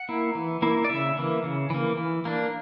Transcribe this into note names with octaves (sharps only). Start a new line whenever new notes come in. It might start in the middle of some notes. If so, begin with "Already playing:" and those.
Already playing: F#5
A#3 E4
E3
A#3 E4
D5
C#3 E5
E3 A#3
C#3
E3 A#3
E3
A#3 D4